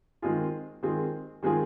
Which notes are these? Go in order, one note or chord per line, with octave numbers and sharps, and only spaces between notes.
D#3 G#3 C4 F4 G#4
D#3 G#3 C4 F4 G#4
D#3 G#3 C4 F4 G#4